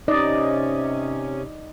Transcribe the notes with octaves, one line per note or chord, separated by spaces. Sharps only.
C3 C#4 D#4 D5 D#5